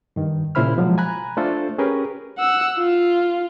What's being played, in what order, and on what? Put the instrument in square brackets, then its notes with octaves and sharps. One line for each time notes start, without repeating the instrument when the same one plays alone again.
[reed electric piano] G2 D#3
A#2 C#3 E4 C5 B5 F6
B2 F3 F#3 G#3
G#5 A#5 B5 F#6
A3 D4 F4 A4 C5
C#4 G4 G#4 A#4 B4
[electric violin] F#5 E6
F4